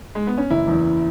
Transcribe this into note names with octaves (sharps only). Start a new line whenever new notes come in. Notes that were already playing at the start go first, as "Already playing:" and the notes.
G#3
B3
C#4
F#1 E3 E4
E2 E3